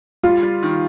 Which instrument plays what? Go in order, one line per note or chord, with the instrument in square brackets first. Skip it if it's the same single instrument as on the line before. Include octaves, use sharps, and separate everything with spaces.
[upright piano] G3 [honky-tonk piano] F4
[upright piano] G3
D#3